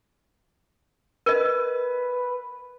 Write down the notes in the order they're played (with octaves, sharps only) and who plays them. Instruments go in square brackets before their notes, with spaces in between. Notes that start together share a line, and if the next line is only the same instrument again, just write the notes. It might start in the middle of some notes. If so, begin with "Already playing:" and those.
[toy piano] A#4 D#5 [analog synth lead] B4